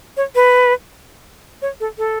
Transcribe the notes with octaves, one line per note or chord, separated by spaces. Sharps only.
C#5
B4
C#5
A4
A4